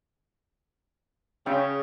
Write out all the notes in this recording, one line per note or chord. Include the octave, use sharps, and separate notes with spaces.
C#3 C#4 E5 G5